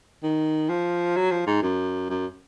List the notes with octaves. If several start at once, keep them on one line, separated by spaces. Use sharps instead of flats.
D#3
F3
F#3
F3
G#2
F#2
F#2